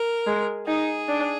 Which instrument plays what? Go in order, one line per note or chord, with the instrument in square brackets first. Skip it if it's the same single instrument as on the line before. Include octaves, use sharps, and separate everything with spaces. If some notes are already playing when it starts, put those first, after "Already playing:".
Already playing: [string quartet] A#4
[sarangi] G#3
[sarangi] D#4 [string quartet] G#4
[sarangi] D4